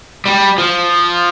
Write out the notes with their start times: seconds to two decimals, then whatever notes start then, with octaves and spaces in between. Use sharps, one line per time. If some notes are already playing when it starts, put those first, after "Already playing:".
0.26 G3
0.58 F3